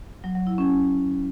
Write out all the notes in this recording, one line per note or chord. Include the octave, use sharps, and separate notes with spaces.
F#3
F#3
E4
C#4